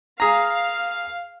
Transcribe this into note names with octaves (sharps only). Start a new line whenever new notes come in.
G#4 F5 A#5